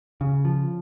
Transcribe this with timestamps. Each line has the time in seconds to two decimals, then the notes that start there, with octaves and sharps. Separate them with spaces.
0.21 C#3
0.45 F3